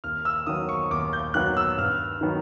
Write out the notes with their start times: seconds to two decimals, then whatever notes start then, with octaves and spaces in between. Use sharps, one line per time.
0.04 D#2 F6
0.25 E6
0.46 D#3 F#3 B3 D#6
0.69 C#6
0.90 D#2 D6
1.13 G6
1.34 D#3 F#3 B3 F#6
1.57 E6
1.77 G2 F6
2.21 D#3 F#3 B3 D#4